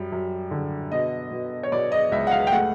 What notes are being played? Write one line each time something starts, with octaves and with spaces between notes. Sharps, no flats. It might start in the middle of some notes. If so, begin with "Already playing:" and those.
Already playing: F#2 G3
F#2
D3
B2 D#5
B2
C#5
B2 D5
D#5
C#2 E5
F#5
F5
G5
A3 F#5